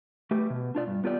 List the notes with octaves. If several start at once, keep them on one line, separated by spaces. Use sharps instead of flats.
A3 G4 B4
B2
D4 F4 D5
G2
B3 F4 G4 D5